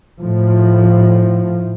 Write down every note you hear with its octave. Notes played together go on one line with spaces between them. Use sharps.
A2 F3